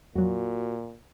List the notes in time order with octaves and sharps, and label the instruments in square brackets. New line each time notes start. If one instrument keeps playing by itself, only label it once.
[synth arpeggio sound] F2 F#3 [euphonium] A#2 [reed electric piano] F#4